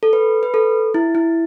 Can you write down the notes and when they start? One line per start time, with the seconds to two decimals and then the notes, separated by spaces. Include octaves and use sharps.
0.03 A4
0.13 B4
0.43 B4
0.54 A4
0.94 E4
1.15 E4